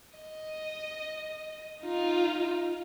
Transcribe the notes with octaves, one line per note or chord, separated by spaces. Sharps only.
D#5
D#4 F4